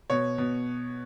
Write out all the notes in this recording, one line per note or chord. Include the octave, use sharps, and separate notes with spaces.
B2 C#5
B2